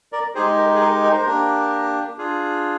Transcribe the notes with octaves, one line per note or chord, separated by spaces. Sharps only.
A#4 D5
G#3 D#4 G4 G#4 C5
A#4
G#4
A#4
A#4
C5
A#3 D4 G4 A#4
D4 F4 G#4